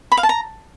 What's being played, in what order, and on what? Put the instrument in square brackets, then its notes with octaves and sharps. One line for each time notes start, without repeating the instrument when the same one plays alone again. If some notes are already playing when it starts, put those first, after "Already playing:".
[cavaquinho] B5
F5
A5
A#5